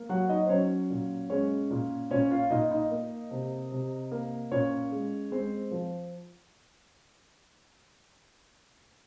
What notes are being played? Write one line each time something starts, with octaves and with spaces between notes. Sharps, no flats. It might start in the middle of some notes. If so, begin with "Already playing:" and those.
Already playing: A#3
F#3 F#4 F#5
D#4 D#5
C5
F#3 C#4 C#5
A#2
G#3 C#4 C#5
A#2
A#2 C#4 C#5
F4 F5
A#2 D#4 D#5
D#4 D#5
A#3
C3
C3
A#3
A#2 C#4 C#5
G#3
G#3 C4 C5
F3